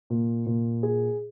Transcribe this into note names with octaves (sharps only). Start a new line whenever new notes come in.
A#2
A#2
G#4